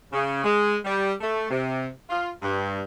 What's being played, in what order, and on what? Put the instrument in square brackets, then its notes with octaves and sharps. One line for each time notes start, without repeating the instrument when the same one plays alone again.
[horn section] C#3
G#3
G3
A3
C3
F4
G2